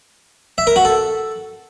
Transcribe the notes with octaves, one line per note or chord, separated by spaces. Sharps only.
E5
A#4
F#4
A4